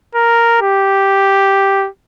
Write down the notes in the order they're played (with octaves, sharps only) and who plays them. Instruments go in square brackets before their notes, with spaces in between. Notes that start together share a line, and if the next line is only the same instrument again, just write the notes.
[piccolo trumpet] A#4
G4